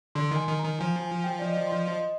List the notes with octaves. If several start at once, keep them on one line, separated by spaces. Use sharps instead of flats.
D3 C6
D#3 G#5
D#3
D#3 A#5
F3 G#5
G#5
G5
D5
D#5
C6
D#5